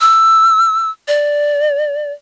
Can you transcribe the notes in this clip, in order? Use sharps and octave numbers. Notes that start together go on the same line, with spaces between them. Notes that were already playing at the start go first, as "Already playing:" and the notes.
E6
D5